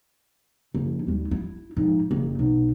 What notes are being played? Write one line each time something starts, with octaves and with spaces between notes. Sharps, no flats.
F#1 F3
D#2 G3
E4
G#2 F3
F#1
B1